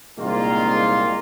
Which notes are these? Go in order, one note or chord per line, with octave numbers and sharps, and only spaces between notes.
C2 A#2 D#3 G#3 A#3 F4